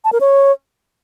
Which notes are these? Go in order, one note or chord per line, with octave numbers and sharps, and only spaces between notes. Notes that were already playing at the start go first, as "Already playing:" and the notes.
A5
A#4
C#5